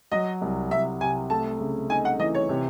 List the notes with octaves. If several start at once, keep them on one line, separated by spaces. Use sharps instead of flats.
F#3 D#5
C2
C2 E5
C3 G#5
A3 A5
C#3
D#4 G#5
F#5
E3 D#5
C#5
C3